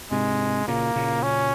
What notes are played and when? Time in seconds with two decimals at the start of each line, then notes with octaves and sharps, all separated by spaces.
0.11 G#2 C3 G#3
0.68 A#2 C#3 A#3
0.96 A#2 C#3
1.23 C#4